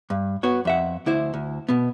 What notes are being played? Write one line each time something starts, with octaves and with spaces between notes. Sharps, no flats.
G2
B3 F#4 C#5
F2 E5 F#5
D2 E4 C5
D2
B2 B3